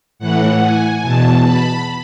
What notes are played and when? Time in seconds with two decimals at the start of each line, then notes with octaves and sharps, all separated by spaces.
0.19 A2 E3 F#5
0.61 G#5
1.03 E2 B2 A5
1.44 B5